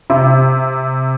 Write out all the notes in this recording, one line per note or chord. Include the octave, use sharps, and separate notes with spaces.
C3